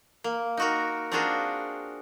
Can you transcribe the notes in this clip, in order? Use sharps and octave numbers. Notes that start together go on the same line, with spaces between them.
A#3
D#4 F#4 A#4
C4 D4 F4 F#4 G#4 A#4